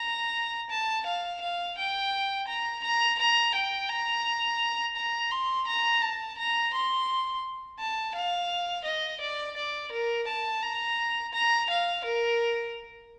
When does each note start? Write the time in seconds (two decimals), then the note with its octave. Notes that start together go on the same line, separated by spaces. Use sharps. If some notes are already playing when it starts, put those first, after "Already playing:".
Already playing: A#5
0.70 A5
1.06 F5
1.41 F5
1.77 G5
2.48 A#5
2.84 A#5
3.19 A#5
3.55 G5
3.90 A#5
4.97 A#5
5.31 C6
5.67 A#5
6.02 A5
6.38 A#5
6.74 C6
7.79 A5
8.15 F5
8.85 D#5
9.21 D5
9.57 D5
9.92 A#4
10.27 A5
10.62 A#5
11.33 A#5
11.70 F5
12.04 A#4